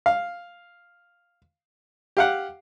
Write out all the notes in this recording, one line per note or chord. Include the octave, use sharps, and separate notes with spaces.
F5
G4 F5 F#5